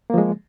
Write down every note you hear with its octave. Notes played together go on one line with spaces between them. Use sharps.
F3 G#3 A#3